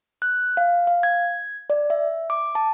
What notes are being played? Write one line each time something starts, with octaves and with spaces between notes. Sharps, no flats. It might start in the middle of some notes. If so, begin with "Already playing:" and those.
F#6
F5
F5
G#6
D5
E5
D6
A5